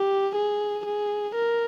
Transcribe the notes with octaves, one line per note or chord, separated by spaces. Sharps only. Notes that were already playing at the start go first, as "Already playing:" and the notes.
Already playing: G4
G#4
G#4
A#4